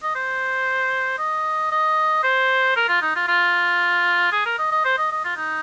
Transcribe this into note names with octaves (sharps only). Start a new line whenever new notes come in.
D#5
C5
D#5
D#5
C5
A#4
F4
D#4
F4
F4
G#4
A#4
D#5
D#5
C5
D#5
D#5
F4
D#4